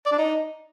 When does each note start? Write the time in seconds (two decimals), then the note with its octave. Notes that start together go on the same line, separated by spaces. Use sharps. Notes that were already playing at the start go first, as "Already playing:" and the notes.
0.06 D5
0.12 D4
0.18 D#4